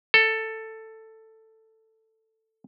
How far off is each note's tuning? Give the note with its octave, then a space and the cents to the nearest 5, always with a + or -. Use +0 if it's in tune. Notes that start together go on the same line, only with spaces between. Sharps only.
A4 +10